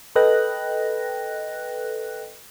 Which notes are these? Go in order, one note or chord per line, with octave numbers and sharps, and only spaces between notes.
A4 B4 D#5 G5 F#6 A#6